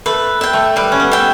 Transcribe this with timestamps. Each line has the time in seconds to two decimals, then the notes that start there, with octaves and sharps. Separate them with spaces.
0.06 A3 B4
0.41 E5 G5
0.53 A3
0.76 G3 B4
0.92 C#4
1.00 B3
1.12 E5 G5